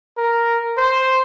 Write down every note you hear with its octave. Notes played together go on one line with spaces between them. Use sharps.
A#4
C5